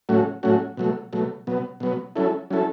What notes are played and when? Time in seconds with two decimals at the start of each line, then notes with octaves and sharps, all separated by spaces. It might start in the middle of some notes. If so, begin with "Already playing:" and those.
0.09 A2 F#3 A3 C#4 F#4
0.43 A2 F#3 A3 C#4 F#4
0.77 B2 F#3 A3
1.13 B2 F#3 A3
1.47 B2 F#3 B3
1.80 B2 F#3 B3
2.16 F#3 C#4 E4 A4
2.50 F#3 C#4 E4 A4